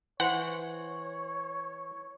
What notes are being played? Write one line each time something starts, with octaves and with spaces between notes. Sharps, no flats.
E3 C5 C#5 F#5